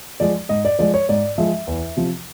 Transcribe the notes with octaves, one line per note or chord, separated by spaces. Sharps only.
F3 G#3 D5
G#2 D#5
D5
F3 G#3 D5
C#5
G#2 D5
F3 G#3 E5
E2
C3 F3